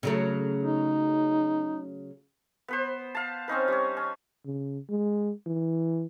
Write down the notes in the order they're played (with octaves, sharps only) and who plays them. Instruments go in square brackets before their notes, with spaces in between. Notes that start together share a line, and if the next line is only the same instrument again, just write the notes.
[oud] C#3 F#3 A3
[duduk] D#4
[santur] B3 B4 C5
F5 A5
C4 C#4 D#4 B4
G3 C#5
C#4
[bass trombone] C#3
G#3
E3